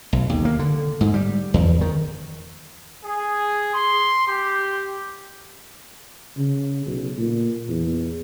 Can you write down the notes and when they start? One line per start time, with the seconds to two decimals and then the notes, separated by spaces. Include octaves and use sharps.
0.13 B1
0.29 D#2
0.45 A#3
0.59 D3
1.01 G#2
1.14 G3
1.54 E2
1.81 D#3
3.05 G#4
3.73 C6
4.27 G4
6.37 C#3
6.86 B1
7.18 A#2
7.68 E2